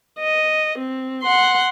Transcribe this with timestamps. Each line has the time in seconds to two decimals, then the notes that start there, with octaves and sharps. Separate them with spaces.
0.20 D#5
0.78 C4
1.23 F#5 C6